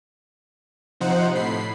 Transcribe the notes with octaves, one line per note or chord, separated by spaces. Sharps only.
C3 F3 D#4 C5 F#5
A2 B5 C7